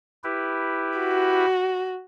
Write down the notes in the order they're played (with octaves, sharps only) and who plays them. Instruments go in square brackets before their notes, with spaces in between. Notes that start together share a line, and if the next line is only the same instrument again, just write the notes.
[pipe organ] E4 G4 B4
[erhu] F#4